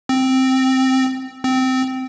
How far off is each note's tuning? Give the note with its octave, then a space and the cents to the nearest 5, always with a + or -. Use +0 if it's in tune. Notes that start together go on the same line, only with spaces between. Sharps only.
C4 +0
C4 -15